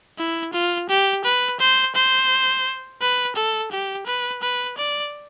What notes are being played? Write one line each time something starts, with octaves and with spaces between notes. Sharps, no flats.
E4
F4
G4
B4
C5
C5
B4
A4
G4
B4
B4
D5